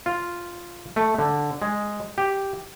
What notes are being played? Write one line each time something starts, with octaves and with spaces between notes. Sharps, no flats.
F4
A3
D3
G#3
G4